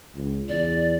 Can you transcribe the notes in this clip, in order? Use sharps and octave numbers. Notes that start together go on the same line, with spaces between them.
C#2
E2 D5